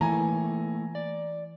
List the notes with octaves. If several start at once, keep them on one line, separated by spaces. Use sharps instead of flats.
E3 A3 A#3 E4 G#5 A#5
D5